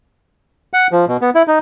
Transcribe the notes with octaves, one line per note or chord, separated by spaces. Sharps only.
F#5
F3
B2
B3
E4
D#4